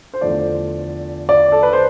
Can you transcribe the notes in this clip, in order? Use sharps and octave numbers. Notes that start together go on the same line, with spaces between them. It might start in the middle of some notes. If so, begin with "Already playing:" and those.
C5
E2 D3 F3 A3 D5
D5
A4
B4
C5